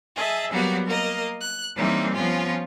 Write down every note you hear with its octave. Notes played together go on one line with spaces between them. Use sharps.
G#4 D#5 E5 A5
F#3 G3 A#3 B3 F#4 G4
A#3 A#4 D#5
F#6
E3 G3 A#3 C4 C#4 D#4
F3 B3 C#4 F4